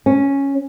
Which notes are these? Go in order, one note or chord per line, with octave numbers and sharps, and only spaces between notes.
C#4